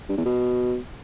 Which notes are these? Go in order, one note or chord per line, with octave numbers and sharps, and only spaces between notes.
G2
E2
B2